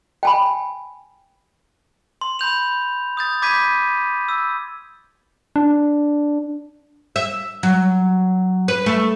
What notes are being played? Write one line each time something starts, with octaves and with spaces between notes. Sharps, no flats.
G5 G#5 B5
C6
B5 C6 G6 F7
D#6 G6 A6
B5 D6 G6 G#6 B6 D#7
E6
D4
E5
F#3
B4
A3